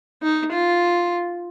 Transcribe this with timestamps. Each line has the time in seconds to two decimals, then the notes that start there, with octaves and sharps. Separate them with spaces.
0.22 D#4
0.52 F4